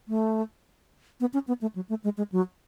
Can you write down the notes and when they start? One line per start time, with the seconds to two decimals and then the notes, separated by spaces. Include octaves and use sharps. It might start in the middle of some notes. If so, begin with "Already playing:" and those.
0.08 A3
1.20 B3
1.34 C#4
1.48 B3
1.61 A3
1.75 F#3
1.89 A3
2.04 G#3
2.17 G#3
2.32 F#3